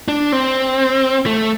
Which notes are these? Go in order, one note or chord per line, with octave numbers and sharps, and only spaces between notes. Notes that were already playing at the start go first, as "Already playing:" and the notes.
D4
C4
A3